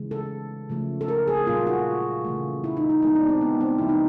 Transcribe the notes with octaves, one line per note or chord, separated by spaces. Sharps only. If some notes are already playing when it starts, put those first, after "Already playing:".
Already playing: C#3 E3 G#3
A4
C#3 F3 A3
A4
A#4
G#4
A#2 G3 A#3 F4
F#4
C#3 E3 A3
E4
D#4
D#4
E3 G#3 B3 D#4
D4
C4
B3
C4
C#3 F3 A3 E4
D#4